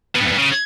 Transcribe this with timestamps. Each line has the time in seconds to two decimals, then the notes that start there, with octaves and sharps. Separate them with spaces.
0.15 B2
0.21 G2
0.27 E2
0.32 G2
0.38 C#3